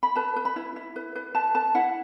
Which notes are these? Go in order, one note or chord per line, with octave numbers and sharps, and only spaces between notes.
B5
B4 A5
B4
B5
E4
E4
B4
B4
B4 A5
B4 A5
E4 F#5